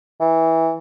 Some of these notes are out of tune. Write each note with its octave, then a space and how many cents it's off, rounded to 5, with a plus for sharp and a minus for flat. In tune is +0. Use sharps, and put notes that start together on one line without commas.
E3 -15